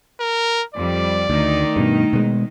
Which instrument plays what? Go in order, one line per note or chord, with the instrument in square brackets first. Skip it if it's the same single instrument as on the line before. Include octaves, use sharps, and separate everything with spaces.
[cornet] A#4
[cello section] F2 G3 [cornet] D5
[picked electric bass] D2 [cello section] D#3 A3 D#4
[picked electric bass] G2 B2
B2 G#3